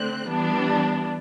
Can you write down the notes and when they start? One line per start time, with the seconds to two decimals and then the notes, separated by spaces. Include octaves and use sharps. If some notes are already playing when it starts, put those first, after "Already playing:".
Already playing: D3 A3 C4 F#6
0.27 E3 G3 B3 D4